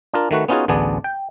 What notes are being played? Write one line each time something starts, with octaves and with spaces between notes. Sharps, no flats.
D4 F4 A#4
D#3 A3 F#4 B4
B3 C#4 D#4 F4 F#4 G#4
A1 D2 B3 D4 G#4 D5
G5